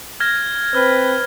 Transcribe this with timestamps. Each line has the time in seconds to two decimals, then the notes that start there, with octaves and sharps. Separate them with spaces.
0.20 F6 G#6 A#6
0.75 C4 B4 F6